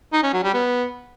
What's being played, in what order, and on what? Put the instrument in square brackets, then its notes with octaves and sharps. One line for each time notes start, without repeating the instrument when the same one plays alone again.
[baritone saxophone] D#4
C#4
F#3
G3
B3